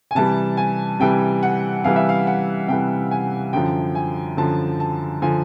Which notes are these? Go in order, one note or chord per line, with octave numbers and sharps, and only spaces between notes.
G#5
C3 E3 G3 A5
G#5
C3 E3 G3 G5
F#5
C3 E3 G3 F5
E5
F5
F#5
C3 E3 G3 G5
G#5
F#2 D3 F3 G5
G#5
F#2 D3 F3 A5
A5
D3 F3 G#5